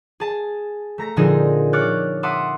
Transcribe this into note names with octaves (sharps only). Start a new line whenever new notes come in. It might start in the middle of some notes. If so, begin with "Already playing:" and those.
G#4 A5
A3 A#5 A#6
A#2 D3 F3 C4 D#4 G#4
C#5 D6 F6 F#6 A6
E5 F#5 A5 C6 D6 D#6